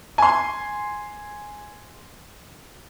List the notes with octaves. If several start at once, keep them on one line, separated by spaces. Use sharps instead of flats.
G#5 C6